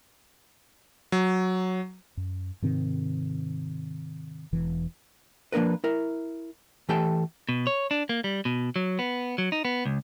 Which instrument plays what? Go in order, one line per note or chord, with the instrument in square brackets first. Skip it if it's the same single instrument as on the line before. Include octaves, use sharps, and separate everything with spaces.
[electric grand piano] F#3
[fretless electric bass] F#2
G#2 C3 D#3 C4
E1 E3
[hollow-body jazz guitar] F3 A#3 D4 A#4 B4
E4 A#4
E3 A3 G4 A4 G5 A5
[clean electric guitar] B2
C#5
D4
A#3
G3
B2
F#3
B3
F#3
D#4
B3
C#2